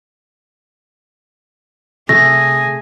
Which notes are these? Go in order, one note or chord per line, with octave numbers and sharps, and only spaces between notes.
C3 A3 G#4 A#6